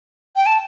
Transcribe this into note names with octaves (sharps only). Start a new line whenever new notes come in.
G5
A5